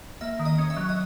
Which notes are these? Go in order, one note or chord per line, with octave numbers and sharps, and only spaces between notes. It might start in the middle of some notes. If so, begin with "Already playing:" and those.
A#3 E5
D#3
D#5
C#4
E5
F#3
D#5